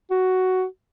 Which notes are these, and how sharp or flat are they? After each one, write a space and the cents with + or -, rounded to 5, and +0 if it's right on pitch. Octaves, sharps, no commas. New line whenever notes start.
F#4 +10